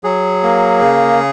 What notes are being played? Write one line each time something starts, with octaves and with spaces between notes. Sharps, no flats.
F#3 G#4
A#3
C#3